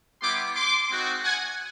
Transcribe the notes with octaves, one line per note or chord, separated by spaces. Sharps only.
G3 B3 E4 G4 C6 D6
C6 D6
G#3 C4 D#4 F#4
F#5 G#5